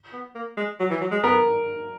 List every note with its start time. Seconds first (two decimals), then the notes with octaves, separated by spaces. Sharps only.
0.13 B3
0.35 A#3
0.57 G#3
0.80 F#3
0.90 E3
1.01 F#3
1.12 G#3
1.24 B3 A#4